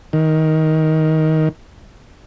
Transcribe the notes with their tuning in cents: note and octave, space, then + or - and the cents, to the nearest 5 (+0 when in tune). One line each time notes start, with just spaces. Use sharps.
D#3 +15